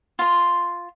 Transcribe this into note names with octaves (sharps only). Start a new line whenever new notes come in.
F4 C6